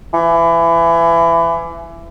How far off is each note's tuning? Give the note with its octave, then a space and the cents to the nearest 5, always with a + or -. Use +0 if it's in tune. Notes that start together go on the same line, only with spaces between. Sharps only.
E3 +25